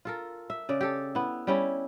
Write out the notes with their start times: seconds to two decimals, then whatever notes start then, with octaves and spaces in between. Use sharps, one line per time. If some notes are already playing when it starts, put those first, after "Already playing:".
0.05 F4 A4 A#4
0.50 E5
0.69 C#3 D5
0.81 G4 A4
1.15 B3 E4
1.47 G3 C#4 E4